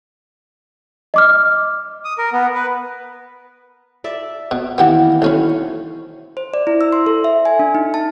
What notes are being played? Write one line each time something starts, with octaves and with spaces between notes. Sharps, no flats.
D#5 D6 F6
D#6
A#4
B3
B4
D5 E5 A5
B2
D#3 E3 A#3 B3 G4 F#5
B1 C#4 C5 C#5 B5
C5
D5
E4
E6
C6
A4
E5
G#5
D4
D#4
A5